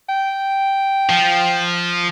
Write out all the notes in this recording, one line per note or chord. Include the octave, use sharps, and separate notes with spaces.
G5
F3